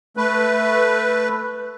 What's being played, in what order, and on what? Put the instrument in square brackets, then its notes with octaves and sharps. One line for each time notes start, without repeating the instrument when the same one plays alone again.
[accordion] A3 B4